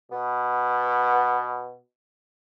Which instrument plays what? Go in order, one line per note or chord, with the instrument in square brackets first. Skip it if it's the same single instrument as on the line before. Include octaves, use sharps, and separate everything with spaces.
[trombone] B2 [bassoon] B3